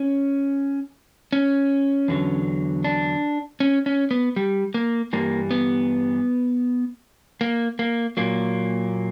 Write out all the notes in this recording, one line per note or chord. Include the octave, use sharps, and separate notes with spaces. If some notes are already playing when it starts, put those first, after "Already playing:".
Already playing: C#4
C#4
E2 D3 F#3
D4
C#4
C#4
B3
G3
A#3
G2 E3 G3 A#3
B3
A#3
A#3
A#2 F#3 A#3